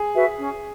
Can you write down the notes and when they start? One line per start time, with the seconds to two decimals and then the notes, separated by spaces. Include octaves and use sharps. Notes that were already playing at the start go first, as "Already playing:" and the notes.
Already playing: G#4
0.14 F#4 B4 E5
0.39 C#4